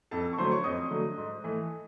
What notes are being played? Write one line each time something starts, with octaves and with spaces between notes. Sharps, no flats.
F2 A4 A5
C#6
D3 F#3 A3 C5 C6
C#5 C#6
F2 D#5 D#6
D3 F#3 A3
G#2
E3 A3